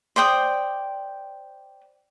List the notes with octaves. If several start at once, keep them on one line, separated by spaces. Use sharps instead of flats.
C5 D5 G5 D#6